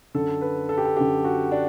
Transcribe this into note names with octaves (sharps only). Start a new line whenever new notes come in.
F#2 D3 A4
B4
A4
G4
A4
F#2 D3 G4
F#4
D4